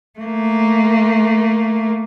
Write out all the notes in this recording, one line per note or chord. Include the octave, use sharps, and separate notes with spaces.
A3 A#3